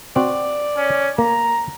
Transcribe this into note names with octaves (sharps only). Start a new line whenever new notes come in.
C4 F#4 D5
C#4
A#3 A#5